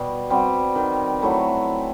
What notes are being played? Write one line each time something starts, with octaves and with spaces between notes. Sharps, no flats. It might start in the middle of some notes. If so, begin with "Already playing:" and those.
Already playing: B2 G3
G3 C4 F#4
D#3
F#3 A3 E4